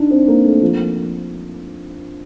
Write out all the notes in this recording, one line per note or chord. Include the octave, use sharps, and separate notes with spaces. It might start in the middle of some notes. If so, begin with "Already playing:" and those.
Already playing: D4 D#4
C4
A#3
A3
F3